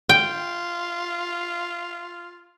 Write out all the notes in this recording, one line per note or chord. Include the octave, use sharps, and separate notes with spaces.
F4 G5